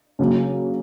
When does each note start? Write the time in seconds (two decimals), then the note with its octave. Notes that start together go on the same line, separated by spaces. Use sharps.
0.19 C#3 F#3 A#3 C#4